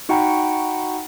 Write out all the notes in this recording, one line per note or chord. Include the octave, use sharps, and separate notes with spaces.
D#4 F#4 F#5 G5 A#5 B5